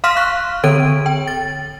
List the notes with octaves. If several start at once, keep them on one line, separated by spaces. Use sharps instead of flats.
F5 C6 F6 B6
C#6 F#6
D3 A4 D7 D#7
G5
A6